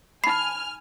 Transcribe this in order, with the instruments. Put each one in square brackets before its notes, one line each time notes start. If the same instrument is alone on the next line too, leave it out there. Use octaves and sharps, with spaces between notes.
[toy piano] D#4 B5 [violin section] G#5 F6 [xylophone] C7